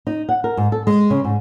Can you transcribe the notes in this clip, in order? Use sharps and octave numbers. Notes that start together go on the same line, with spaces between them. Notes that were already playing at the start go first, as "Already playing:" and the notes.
D#4
F#5
A#4
G#2
A4
G#3
C#3
G#2